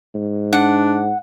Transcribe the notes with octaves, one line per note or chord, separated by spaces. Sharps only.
G#2
D4 F#5